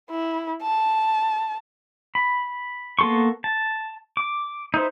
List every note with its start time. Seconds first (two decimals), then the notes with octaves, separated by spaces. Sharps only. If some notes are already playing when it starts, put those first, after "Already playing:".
0.10 E4
0.62 A5
2.15 B5
2.99 A#3 B3 A4 C6 C#6
3.44 A5
4.17 D6
4.74 D#4 E4 B4 C5